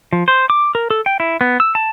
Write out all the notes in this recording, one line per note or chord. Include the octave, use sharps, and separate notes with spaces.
F3
C5
D6
A#4
A4
G5
E4
B3
E6
A5